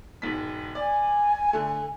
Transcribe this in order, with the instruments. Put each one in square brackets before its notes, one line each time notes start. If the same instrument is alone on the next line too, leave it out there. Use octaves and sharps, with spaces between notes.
[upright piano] E1 G#2 B6
[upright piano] D5 [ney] G#5
[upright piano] D3 A3